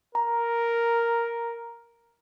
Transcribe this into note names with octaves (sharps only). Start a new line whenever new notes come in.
A#4 A#5